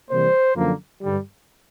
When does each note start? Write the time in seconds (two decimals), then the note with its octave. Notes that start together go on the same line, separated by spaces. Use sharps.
0.10 C3 E3 G3 A#3 C5
0.56 F#2 D3 F3 A#3
1.01 G2 D3 G3